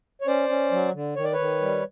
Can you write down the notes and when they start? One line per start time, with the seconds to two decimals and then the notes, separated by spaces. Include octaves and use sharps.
0.21 C#5
0.27 C#4 C5 D5
0.49 C#4
0.71 F#3
0.94 D3
1.16 D#3 C#5
1.24 D5
1.33 B4 C#5
1.39 D#3
1.61 G3